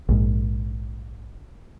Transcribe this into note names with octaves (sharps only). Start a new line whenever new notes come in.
A#1 G#2